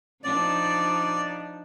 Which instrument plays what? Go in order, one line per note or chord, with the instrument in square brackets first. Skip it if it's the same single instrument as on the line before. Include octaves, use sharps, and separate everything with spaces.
[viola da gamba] F3 D4 D#4 [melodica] D5